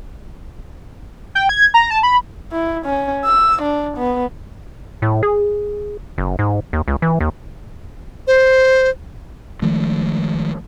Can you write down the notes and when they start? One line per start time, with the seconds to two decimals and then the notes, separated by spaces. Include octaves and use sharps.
1.35 G5
1.49 G#6
1.74 A#5
1.91 A5
2.03 B5
2.52 E4
2.86 C#4
3.25 E6
3.62 D4
3.97 B3
5.02 A2
5.23 G#4
6.18 F#1
6.39 G#2
6.73 D#2
6.88 C#2
7.02 E3
7.20 D#2
8.27 C5
9.62 D#3 F3 G#3 A3